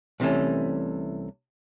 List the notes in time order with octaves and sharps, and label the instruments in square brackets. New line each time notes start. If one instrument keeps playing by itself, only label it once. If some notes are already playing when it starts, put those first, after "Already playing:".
[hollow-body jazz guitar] C2 C3 E3 A3 C#4